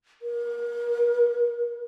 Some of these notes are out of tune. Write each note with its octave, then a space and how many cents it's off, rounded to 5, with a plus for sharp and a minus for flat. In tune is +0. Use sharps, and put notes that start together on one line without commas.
A#4 +35